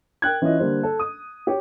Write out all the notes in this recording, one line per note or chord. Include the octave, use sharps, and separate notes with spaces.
A#4 G5 F#6 G#6
E3 C#4 E4 F4 D#5
D3 G3 A#3 C5
A4
D#6
G4 C#5